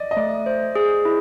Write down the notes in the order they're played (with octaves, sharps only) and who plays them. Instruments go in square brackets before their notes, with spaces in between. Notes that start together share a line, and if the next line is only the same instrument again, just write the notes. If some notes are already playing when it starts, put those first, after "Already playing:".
Already playing: [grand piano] D5 D#5
D#5
[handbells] A3 [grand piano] D5
[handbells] C5
G#4
E4